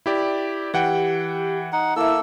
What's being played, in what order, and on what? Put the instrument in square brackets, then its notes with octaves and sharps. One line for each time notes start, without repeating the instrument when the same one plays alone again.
[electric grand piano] E4 G4 D5
[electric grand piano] E3 F#5 G5 [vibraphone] G4
[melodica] D#4 F#5
[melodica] A#3 A4 E6 [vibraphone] E4 E5